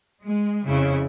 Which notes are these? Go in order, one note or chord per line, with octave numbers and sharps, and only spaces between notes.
G#3
F2 C#3 E4